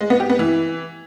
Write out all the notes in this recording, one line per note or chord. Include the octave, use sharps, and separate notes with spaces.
G#3
B3
G4
B3
E3